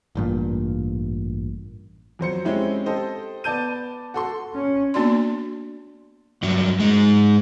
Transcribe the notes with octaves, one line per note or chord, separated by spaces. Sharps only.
A1 G2 A#2
F2 F#3 C5 C#7
G#3 C4 C#4 E4 G4
G4 A4 C5 D#5
B3 D5 A5 G6 D#7
F#4 A4 C6
C#4
A#3 B3 D4 F#4 D5 C6
G2 F#3
G#2 G#3